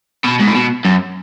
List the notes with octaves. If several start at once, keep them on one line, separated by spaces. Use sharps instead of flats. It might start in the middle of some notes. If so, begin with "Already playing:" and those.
B2
G#2
A2
B2
F#2